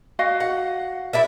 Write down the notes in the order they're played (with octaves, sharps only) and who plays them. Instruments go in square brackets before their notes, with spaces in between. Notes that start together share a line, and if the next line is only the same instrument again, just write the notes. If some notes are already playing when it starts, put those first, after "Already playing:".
[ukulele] F#4 D#5 F5
[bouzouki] F#5
E4 D5 E5